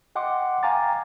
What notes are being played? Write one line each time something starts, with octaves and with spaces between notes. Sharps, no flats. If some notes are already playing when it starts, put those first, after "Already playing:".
D#5 F#5 G5 C6 D6
F5 G5 G#5 A#5 D6 A6